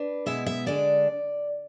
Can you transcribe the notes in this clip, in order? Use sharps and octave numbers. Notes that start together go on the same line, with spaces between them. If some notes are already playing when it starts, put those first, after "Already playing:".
Already playing: D4 B4
B2 G#3 B3 E4 E5
E5
D3 G#3 D4 D5